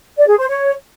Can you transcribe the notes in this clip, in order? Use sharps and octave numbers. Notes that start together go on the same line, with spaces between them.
D5
G#4
C5
C#5